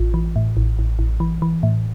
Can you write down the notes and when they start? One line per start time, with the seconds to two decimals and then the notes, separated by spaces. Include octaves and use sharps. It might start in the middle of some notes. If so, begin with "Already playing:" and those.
Already playing: A1 F4
0.14 E3
0.36 A2
0.57 A1
0.79 A1
0.99 A1
1.20 E3
1.42 E3
1.63 A2